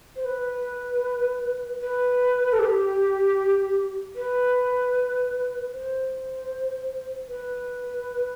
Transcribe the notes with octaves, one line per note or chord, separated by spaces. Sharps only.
C5
B4
B4
A4
G4
B4
C5
B4